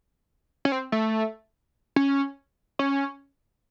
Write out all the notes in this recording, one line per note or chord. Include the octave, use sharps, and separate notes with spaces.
C#4
C4
A3
C#4
C#4